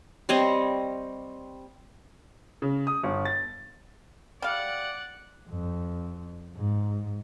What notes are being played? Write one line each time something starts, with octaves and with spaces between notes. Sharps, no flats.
G3 C4 C#5 D#5
C#3
D#6
G1
A6
G3 D5 F5 F#5
F2
G#2